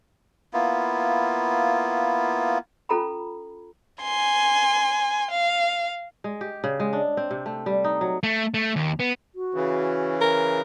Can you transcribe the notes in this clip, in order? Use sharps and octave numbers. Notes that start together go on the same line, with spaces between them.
A#3 B3 E4 F4
C#4 F4 A4 A#5 B5
G#5 C6
F5
G#3
G4
C#3
G#3
D4
C4
C3
A3
G3
D#4
F#3
A3
A3
D#2
B3
F#4
C#3 E3
A#4